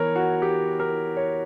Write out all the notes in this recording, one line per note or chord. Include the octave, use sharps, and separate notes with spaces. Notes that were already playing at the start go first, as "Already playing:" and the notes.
Already playing: E3 B3 A#4 C#5
F#4
G4
A#4
C#5